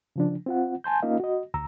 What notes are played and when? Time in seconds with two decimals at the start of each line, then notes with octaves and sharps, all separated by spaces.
0.16 C#3 F3 D4
0.46 C4 F4 F#5
0.84 G#5 A5 C6 G6
1.02 A#3 C#4 D#4 F4 D#5 F5
1.20 F#4 D#5
1.54 D2 A#5 E6